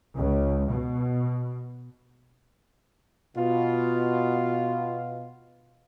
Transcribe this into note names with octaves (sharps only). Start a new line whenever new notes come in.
C#2
B2
B2 F4